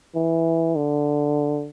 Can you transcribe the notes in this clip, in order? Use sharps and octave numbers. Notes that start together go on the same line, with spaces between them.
E3
D3